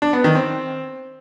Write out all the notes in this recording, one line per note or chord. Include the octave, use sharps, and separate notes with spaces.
D4
B3
D#3
C4